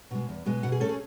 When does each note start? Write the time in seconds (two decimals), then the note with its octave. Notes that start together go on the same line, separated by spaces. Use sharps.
0.11 B2 G#3
0.29 E2
0.46 B2 G#3 B3
0.63 B2 F#5
0.72 G#4
0.80 A3 C#4 A4
0.89 G#4